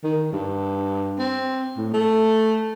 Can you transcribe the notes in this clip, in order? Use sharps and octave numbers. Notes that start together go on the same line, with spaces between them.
D#3
G2
C4
A2
A3